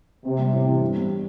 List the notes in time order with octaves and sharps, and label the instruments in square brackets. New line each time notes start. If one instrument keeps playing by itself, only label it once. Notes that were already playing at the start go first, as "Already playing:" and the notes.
[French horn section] C3 [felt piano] C4
[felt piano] G3
A2
E3
G2
G3